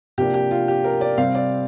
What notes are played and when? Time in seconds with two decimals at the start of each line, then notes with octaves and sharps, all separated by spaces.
0.18 C3 F3 A#3 D4 G4
0.34 G4
0.51 F4
0.68 G4
0.84 A#4
1.01 D5
1.17 C3 G3 C4 F5
1.35 D5